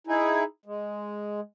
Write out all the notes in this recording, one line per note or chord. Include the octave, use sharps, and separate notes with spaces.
D#4 E4 G#4
G#3